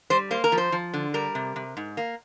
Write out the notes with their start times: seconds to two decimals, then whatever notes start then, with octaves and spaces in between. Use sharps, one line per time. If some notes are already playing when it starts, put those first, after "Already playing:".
0.10 G3 C5
0.31 A#3 C5
0.44 A#4
0.52 F3
0.58 C5
0.72 F3
0.94 D3
1.14 G3 A#4
1.35 C3
1.56 C3
1.77 G#2
1.97 A#3